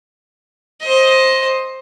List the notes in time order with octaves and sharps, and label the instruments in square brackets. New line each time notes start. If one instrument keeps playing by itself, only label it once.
[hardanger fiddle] C5 D#5